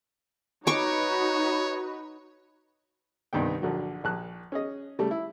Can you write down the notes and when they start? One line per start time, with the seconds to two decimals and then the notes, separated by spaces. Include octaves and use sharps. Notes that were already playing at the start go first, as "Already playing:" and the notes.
0.67 D#4 F#4 B4 C#5 C#6 D6
3.33 C2 G2 D#3 B3 G5
3.62 A#1 D3 F#3
4.04 A#1 A5 F#6
4.52 C#4 G#4 D#5
4.99 C#3 G3 A3
5.11 E4